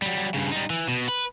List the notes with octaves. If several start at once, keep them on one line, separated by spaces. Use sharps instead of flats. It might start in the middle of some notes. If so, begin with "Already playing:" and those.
F#3 G3
G2 C#3
G3 D#4
E3
B2
B4